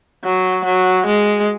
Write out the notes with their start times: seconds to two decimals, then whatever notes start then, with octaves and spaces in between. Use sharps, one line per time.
0.24 F#3
0.65 F#3
1.06 G#3